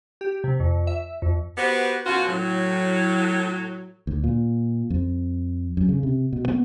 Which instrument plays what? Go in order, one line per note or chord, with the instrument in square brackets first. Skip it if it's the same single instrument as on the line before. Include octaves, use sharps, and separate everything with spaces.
[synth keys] G4
C3
F2
E5
F2
[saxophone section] B3 F#4 G4 B4 C5
F#2 B2 F4 F#4
A2 F#3
[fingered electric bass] D2
A#2
F2
F#2
C#3
C3
B2
B3